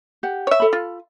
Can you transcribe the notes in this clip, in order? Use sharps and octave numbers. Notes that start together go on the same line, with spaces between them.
G4 F#5
C#5 E5
A4 B5
F4